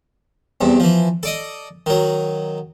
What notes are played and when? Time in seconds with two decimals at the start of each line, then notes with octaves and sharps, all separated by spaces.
0.61 E2 G2 C3
0.80 E3 F3
1.23 A4 D5 D#5
1.86 D#3 F#3